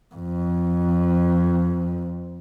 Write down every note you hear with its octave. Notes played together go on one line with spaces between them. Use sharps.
F2